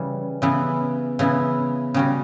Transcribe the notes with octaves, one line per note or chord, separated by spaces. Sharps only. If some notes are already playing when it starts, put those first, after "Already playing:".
Already playing: C#3 E3 G3 C#4
C#3 E3 B3 E4
C#3 E3 B3 E4
C#3 G3 C#4 F#4